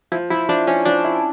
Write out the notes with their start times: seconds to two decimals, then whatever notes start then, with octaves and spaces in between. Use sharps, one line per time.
0.12 F3 E4
0.30 F3 E4
0.49 F3 D4
0.67 F3 C#4
0.85 F3 D4
1.04 E4